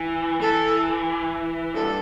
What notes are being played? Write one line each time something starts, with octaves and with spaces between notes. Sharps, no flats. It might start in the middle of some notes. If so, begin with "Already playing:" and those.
Already playing: E3
E3 A4
G2 A4